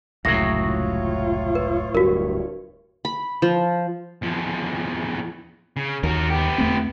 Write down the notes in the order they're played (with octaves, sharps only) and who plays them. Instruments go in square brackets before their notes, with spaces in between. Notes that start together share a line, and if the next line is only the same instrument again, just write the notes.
[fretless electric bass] F1 C#2 A#3 [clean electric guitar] A2 F#3 [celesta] A#6
[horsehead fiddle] F4 C#5
[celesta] B4
[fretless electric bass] D1 G2 [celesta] F#4 A#4
[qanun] B5
F3
[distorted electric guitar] E2 F3
C#3
[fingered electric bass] D#2 [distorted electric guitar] F#4 A#4
[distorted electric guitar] B3 G4
[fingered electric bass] E2 A3 C4